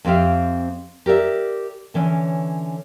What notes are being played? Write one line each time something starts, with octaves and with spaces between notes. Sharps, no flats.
F2 C4 G4 E5 F5
G4 A#4 D5 E5
D3 E3 C#4 C#5